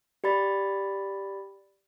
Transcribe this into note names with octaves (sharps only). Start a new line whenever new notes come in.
G4 D5 B5 A6